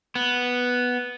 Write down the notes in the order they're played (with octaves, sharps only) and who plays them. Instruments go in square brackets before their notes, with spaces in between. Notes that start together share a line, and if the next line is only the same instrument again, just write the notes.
[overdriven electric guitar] B3